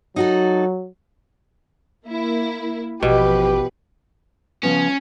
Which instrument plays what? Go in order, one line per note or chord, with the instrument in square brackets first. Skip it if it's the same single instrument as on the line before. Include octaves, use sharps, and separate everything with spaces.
[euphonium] F#3 [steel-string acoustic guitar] D#4 F#4 A4
[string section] A#3 E4
[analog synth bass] A1 [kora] B2 [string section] F3 B4 [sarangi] G4
[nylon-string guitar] C#3 F3 B3 [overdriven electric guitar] C#4